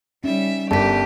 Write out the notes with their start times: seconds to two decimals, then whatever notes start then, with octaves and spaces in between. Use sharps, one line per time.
0.24 G3 C#4 D#4 E5
0.71 G1 G4 A#4 D5 A5 B6